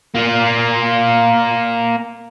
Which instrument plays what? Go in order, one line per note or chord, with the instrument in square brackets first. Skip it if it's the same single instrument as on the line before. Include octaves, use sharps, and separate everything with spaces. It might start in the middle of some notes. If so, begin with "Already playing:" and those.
[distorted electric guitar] A#3 F4